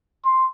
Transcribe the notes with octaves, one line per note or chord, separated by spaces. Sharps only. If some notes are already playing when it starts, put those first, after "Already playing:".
C6